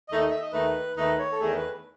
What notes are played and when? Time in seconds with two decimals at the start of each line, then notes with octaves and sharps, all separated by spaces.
0.08 D#2 D#3 A3 D#4 D#5
0.20 D#5
0.30 E5
0.42 D#5
0.52 D#2 D#3 A3 D#4 B4
0.97 D#2 D#3 A3 D#4 B4
1.19 C#5
1.32 A4
1.41 E2 D#3 A3 G#4
1.56 B4